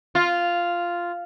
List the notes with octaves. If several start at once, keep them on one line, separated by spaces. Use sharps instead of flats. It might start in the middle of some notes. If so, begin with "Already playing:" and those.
F4